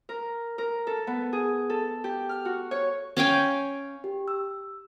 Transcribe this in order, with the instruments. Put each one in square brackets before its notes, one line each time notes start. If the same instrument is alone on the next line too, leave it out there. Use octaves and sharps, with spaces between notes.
[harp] A#4
A#4
A4
B3
G#4
A4
G4
F6
F#4
C#5
[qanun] C#4 F5 G5 G#5
[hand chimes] G4
E6